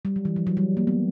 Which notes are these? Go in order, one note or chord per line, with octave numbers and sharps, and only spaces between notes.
G3
F#3
E3
F3
F#3
G3
A#3
B3